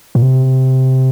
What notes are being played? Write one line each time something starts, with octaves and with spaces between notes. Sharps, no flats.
A#2
C3